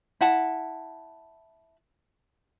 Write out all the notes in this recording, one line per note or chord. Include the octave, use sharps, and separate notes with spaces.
E4 F#5 A5